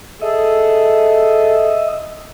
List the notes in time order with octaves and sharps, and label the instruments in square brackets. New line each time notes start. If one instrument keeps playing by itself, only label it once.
[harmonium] G#4 A4 [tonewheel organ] D#5 E5